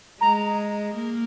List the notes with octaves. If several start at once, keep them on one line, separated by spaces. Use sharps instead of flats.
G#3 A#5
A#3